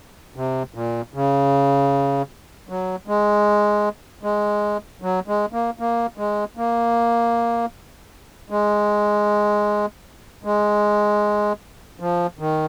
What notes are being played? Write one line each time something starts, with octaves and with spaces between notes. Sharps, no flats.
C3
A#2
C#3
F#3
G#3
G#3
F#3
G#3
A#3
A#3
G#3
A#3
G#3
G#3
F3
D#3